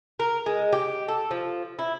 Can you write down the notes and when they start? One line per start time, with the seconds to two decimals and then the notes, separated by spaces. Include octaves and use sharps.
0.20 A#4
0.46 G#3
0.73 G4
1.08 A4
1.31 F3
1.79 E4